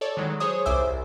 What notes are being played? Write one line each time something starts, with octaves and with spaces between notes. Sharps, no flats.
A4 C#5 D5
D#3 E3 F#3 G#3
G#4 C5 C#5 D#6
C2 C5 E5 G#5 D6 E6
C2